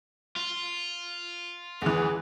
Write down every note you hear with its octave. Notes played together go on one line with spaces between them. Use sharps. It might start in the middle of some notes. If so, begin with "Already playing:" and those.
F4
E2 E3 G#4